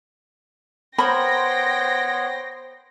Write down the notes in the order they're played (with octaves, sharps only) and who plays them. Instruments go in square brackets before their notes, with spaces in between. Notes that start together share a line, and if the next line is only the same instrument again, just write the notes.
[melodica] B3 C#5 [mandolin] A#4 C5 [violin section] G5 C6 A#6 [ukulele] B5